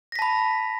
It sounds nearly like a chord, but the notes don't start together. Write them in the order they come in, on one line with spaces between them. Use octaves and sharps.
A#6 B6 A5 B5